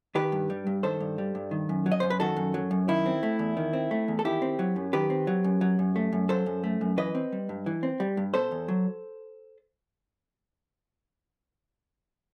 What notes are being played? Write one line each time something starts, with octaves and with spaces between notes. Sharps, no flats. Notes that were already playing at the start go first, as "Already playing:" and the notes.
D#3 G4 B4
G2
G3
G2
D#3 A4 C5
G2
G3
G2
D#3
F#2
F#3
D#5
F#2 C5
B4
D#3 F#4 A4
F#2
F#3
F#2
D#3 E4
C4
A3
E2
D#3
C4
A3
E2
A4
D#3 E4 G4
C4
F#3
F#2
D#3 G4 B4
C4
F#3
F#2
F#3
F#2
A3
F#2
F#3 A4 C5
F#2
A3
F#2
E3 B4 D#5
C4
G3
G2
E3
C4
G3
G2
B2 A4 C5
E2
F#3